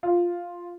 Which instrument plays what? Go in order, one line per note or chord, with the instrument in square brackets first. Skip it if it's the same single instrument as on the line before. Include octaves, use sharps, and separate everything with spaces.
[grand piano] F4